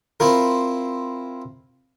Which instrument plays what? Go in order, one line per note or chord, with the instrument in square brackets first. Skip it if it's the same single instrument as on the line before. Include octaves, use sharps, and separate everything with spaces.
[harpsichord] C4 E4 F4 A#4